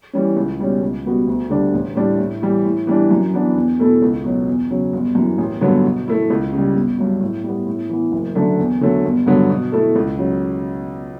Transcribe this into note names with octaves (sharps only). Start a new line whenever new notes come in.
E3 G3 C#4
C#2
B2 G3 C#4
C#2
B2 G3 B3 F#4
D2
D3 G3 D4
A1
A2 G3 D4
A2
E3 G3
A2
E3 G3 D4
F#2
E3 B3 D4
E2
B2 A3 E4 A4
C#2
B2 F#3
E2
C#3 F#3
G1
F#2 E3
A1
G2 D3 F#3 B3
B2
A3 E4
C#2
C#3 G3
G1
G2 F#3
A2
G3 B3
A2
E3 B3
F#1
F#2 D3 A3 D4
E2
D3 F#3 A3
G1
G2 D3 F#3 B3
B2
A3 E4 A4
C#2
C#3 F#3